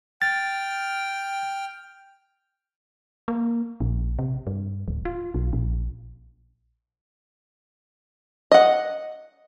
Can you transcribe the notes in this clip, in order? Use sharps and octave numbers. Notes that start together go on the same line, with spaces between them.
G5 F6 A6
A#3
A#1
C3
G2
D1
F4
B1
A#1
D#5 F#5